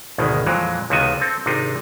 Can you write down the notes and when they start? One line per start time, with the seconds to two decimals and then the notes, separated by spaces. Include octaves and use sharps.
0.18 G#1 D2 B2 D#3 G#3
0.46 F2 A#2 E3 F#3 G#3
0.90 C#2 C3 D#3 B3 F#4 G#5
1.20 C4 A4
1.46 G#1 C3 D4 D#4